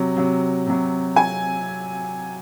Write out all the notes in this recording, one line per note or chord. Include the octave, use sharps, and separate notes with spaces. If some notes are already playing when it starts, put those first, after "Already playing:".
Already playing: C3 F#3
C3 F#3
C3 F#3
G#5